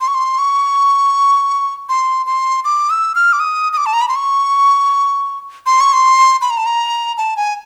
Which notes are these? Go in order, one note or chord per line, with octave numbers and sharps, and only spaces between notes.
C6
C#6
C6
C#6
C6
C6
D6
E6
F6
D6
D#6
D#6
D6
A5
A#5
B5
C6
C#6
C6
C#6
C6
B5
A#5
A5
A#5
A5
G#5